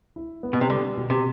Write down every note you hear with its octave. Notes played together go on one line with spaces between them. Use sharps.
E4
B3
B2
C3
D3 G3
B2
C3